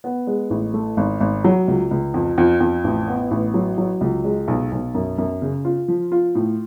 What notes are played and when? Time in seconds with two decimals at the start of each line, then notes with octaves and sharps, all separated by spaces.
0.04 B3
0.27 G#3
0.50 A1
0.74 A3
0.97 G#1
1.20 G#1
1.44 F#3
1.68 C#2
1.91 C#2
2.14 F2
2.38 F2
2.60 F2
2.84 A1
3.08 B3
3.31 A1
3.54 F#3
3.78 F#3
4.01 C#2
4.24 G#3
4.48 B1
4.72 B1
4.95 F#2
5.18 F#2
5.42 C#3
5.65 F4
5.88 F3
6.12 F4
6.35 A2